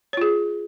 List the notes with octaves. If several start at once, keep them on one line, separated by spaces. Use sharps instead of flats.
F4 G#4 C#5